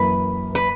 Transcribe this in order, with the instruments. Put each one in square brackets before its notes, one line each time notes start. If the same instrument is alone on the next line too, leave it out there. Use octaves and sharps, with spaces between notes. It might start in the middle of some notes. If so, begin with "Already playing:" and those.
Already playing: [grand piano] F#2 E3 A#3 [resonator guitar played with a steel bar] B4
[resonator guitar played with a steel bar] B4